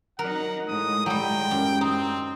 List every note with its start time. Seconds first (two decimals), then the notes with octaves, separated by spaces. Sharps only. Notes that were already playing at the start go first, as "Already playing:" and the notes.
0.19 F#3 D#4 A#4 F#5
0.68 A2 G#3 D#6
1.06 F#3 G3 G5
1.51 F#2
1.81 C4 D#4